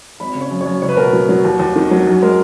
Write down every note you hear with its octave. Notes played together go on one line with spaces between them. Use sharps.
G#1 B5
C#3
C#5
F#2
C#5
F#2
C#2 C#5
B4
B2 A#4
B4
F#3
F#3
D#2
D#2
D#3
F#3
F#2
G#3 A#4